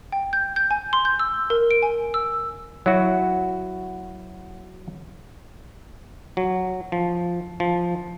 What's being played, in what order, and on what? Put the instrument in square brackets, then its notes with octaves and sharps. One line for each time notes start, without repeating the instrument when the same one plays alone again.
[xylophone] G5
G6
G6
G#5
C6
G6
E6
A#4
D7
G#5
E6
[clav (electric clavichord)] F#3 E4 F#4
F#3
F3
F3